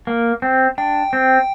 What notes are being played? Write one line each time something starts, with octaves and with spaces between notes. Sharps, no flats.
A#3
C4
D4 G5
C4